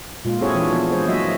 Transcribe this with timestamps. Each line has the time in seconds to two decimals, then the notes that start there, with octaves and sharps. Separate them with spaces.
0.25 A#2 G#3 F4
0.41 C4 E4 F#4 G#4 A4 C#5
0.55 E3 D4
0.70 F3 B3
0.92 G#3 G#4 C5 C#5
1.07 F#3 A#3 F#4 D#5 E5